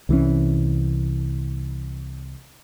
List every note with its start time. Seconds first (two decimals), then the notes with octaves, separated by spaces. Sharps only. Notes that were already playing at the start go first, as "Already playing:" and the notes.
0.09 C2 E3 G3 C#4